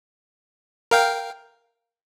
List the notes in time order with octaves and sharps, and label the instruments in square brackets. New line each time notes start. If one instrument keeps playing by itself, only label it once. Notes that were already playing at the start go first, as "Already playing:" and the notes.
[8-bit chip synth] A#4 F5 G5